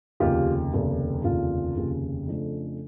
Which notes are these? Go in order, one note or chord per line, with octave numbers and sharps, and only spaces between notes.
F1 D#2 C#3 F4 G4
F1 D#2 C#3
F1 D#2 C#3 F4
F1 D#2 C#3
F2 C#3 F3 A3 D4